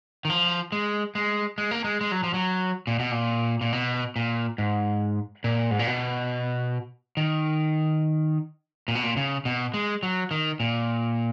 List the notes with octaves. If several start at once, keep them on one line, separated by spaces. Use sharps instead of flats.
D#3
F3
G#3
G#3
G#3
A#3
G#3
G#3
F#3
F3
F#3
A#2
B2
A#2
A#2
B2
A#2
G#2
A#2
G#2
A#2
B2
D#3
A#2
B2
A#2
C#3
B2
G#3
F#3
D#3
A#2